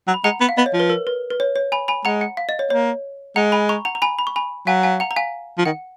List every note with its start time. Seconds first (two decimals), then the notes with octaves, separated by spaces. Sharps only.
0.07 F#3
0.14 B5
0.24 G#3 F#5 A#5
0.40 B3 F#5
0.49 F5
0.57 B3 D#5
0.66 C#5
0.73 F3
0.80 B4
0.90 A#4
1.07 B4
1.30 B4
1.40 C#5
1.56 C#5
1.72 G#5 B5
1.88 G#5 B5
2.05 G#3 F#5 A#5
2.21 F#5
2.37 F5
2.49 D#5
2.59 C#5
2.70 A#3 C#5
3.36 G#3 F#5 A#5
3.52 G#5 B5
3.69 A#5 C#6
3.85 F#5 A#5
3.95 A#5
4.02 G#5 B5
4.19 B5
4.27 C#6
4.36 G#5 B5
4.67 F#3 F5 G#5
4.83 F5 G#5
5.00 F#5 A#5
5.11 A#5
5.16 F5 G#5
5.58 F3
5.65 D#3 F#5